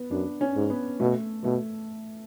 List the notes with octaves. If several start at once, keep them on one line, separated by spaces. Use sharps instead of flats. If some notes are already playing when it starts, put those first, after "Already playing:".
Already playing: B3
F#2 D4
C#4
G#2
B3
B2 A3
B2 A3